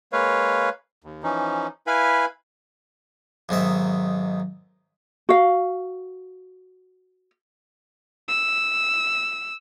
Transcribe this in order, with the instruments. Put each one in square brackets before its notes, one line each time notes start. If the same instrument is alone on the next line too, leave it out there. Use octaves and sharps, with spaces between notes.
[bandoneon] G#3 A#3 B4 C#5 F5
D#2
E3 F3 C#4 D#4
E4 B4 F5 G#5 B5
[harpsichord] B1 G#2 D#3 E5
[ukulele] F#4 F5
[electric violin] E6